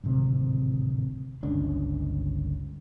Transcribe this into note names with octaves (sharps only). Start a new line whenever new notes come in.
D1 G#1 C3
G1 C#2 C#4 D4